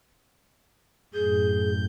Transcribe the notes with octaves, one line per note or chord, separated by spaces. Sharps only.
F#2 A2 G#4 G6